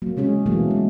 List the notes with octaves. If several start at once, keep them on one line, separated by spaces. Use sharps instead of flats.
F#3 A#3
C#3 G#3 C#4 G#4
B2 E3 F#3 A3 A#3
G#3